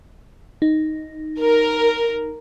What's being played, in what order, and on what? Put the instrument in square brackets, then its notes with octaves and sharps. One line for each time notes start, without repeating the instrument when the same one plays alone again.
[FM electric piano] D#4
[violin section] A#4